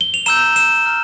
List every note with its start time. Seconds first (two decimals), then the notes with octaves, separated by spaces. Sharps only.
0.01 G7
0.14 F7
0.26 A#5 E6 G6 E7
0.56 E7
0.86 A#5 F6